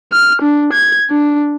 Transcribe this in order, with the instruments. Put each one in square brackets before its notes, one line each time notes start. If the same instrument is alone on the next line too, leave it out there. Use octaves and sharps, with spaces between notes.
[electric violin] F6
D4
G#6
D4